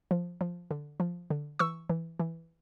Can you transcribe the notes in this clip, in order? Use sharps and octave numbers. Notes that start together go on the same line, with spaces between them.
F3
F3
D3
F3
D3
E3 C#6 E6
E3
E3